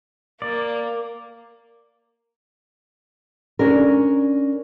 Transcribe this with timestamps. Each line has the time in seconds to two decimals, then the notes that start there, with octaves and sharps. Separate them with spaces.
0.42 A#3 D5
3.59 C#4 D4 A#4